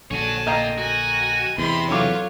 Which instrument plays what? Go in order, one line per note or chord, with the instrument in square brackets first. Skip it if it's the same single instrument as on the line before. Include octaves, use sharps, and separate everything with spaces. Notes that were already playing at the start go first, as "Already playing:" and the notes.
[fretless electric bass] A#1 D3 [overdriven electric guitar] F#4 C#5 [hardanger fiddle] G#5 A5
[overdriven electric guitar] A#3 F4 [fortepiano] D#5 G5 A#5
[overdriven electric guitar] F#4 [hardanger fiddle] A#4 G#5
[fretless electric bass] E2 [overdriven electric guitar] C3 [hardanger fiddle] B5 C6
[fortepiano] D3 F#3 D6 [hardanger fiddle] F4 C#5